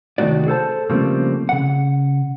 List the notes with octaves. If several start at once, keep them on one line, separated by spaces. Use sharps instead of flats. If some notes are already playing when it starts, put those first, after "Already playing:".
C2 D#3 F#3 A3 F#4 D5
G#4 A4 C5 A5
C#3 F3 G3 A3 A#3 C4
C#3 F#5